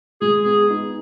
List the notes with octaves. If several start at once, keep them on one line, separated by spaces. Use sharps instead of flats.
G#3 G#4
B3 G#4
D#4